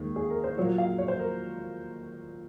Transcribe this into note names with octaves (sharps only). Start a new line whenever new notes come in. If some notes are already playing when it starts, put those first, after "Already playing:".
Already playing: D#2 D#3 G#3
G#4
A#4
C5
A#2 F#3 A#3 C#5
F5
C#5
C5
A#4